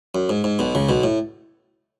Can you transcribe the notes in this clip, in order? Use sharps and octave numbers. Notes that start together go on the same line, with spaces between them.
F#2
G#2
G#2
B1 B2
C#2 C#3
B1 B2
A2